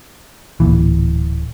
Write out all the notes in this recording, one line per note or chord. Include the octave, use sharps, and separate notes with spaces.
D1 B1 A#2 E3